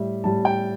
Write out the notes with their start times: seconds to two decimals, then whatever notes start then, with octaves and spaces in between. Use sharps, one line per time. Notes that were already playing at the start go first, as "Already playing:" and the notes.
Already playing: A2 G3 E5
0.23 A2 G3 A5
0.45 G5